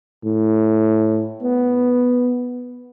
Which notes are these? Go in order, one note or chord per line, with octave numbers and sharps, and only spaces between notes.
A2
B3